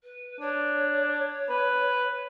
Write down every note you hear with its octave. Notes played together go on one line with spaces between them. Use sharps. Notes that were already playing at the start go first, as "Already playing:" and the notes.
B4
D4 C#5
B4